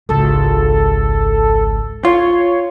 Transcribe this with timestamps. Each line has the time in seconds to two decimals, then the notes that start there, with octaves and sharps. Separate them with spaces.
0.09 G#1 C#2 A4
2.05 F4 C#5